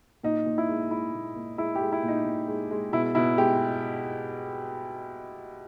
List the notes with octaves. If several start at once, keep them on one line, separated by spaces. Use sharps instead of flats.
A#2 D#4
A#2
E4
G#3
G#3 E4
A#2
A#2
G#3 E4
G4
G#3
E4
A#2
D#4
A#2
G#3
G#3
B2 E4
B2 E4
G#3 G4